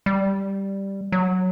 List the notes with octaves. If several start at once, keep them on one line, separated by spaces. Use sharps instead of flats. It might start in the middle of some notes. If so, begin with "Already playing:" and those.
G3
F#3